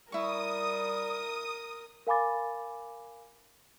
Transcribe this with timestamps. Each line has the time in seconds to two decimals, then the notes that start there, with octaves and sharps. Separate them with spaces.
0.12 G3 E4 A#4 C#6 D#6
2.07 A#4 F5 G#5 B5 D6 A6